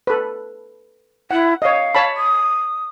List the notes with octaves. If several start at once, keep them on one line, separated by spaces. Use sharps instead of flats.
A4 B4
E4 F#5
C#5 D#5 F5
C#5 A5 B5
D#6